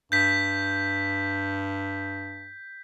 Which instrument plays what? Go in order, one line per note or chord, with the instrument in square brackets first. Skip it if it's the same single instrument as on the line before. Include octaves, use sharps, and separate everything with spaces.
[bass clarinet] G2 [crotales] G6 B6